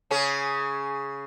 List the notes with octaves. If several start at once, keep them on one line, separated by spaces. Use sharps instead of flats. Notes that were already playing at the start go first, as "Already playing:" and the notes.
C#3 C#4 G#4